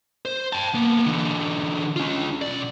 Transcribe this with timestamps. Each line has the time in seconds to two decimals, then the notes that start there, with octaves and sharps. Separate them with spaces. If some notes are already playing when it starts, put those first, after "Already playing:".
0.25 C5
0.53 G5 A5
0.74 A#3 B3
1.06 D3 E3
1.96 C#4 F4
2.42 B1 D5